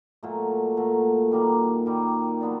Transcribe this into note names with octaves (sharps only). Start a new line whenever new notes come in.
A#2 F#3 A3
A#2 F#3 A3
D#3 G3 A#3
D#3 G3 A#3
F#3 B3 D4